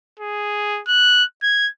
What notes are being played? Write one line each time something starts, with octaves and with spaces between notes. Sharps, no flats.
G#4
F#6
G#6